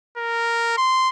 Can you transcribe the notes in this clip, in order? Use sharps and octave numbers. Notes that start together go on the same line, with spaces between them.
A#4
C6